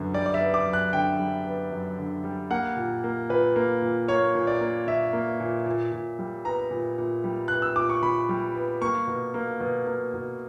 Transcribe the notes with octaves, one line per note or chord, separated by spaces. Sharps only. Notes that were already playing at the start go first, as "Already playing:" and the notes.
Already playing: F#2 D3 B3
G3 D5
D5
E5
B3
D6
F#2
F#6
D3 G5
G3
B3
F#2
D3
G3
A#3 F#5
A#2
A#3
A#2 B4
A#3
A#2
A#3 C#5
A#2
D5
A#3
A#2 E5
A#3
A#2
A#2
A#2
G3
B3 A#5
A#2
A#2
G3
B3 F#6
E6
A#2 D6
C#6
A#2 B5
G3
B3
A#3 C#6
B2
A#3
B2
A#3
B2